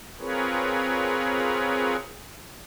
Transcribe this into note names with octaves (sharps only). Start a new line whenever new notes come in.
C4 F4 G#4 A#4 B4 C#5